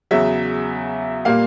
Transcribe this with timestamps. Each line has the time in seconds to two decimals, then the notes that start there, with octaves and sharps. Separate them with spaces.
0.11 E2 C#3 F#3 E5
1.25 A#2 G3 A#3 F5